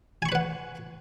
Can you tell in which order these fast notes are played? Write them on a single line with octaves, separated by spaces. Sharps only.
G#5 C#6 B5 B4 F#5